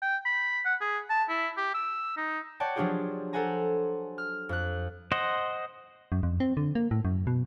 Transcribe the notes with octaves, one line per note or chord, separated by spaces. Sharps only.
G5
B5
F#5
G#4
A5
E4
G4
E6
D#4
C#5 D5 F#5 G5 A5
F3 F#3 D4 F4 G4 G#4
A4 C5 F#5 G#5 A#5
F6
F2 F#6
C5 D#5 F#5
F#2
F2
C4
D3
A#3
A2
F#2
B2